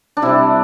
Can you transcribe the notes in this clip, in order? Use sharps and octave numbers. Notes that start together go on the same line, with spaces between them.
D4
C3 G3 E4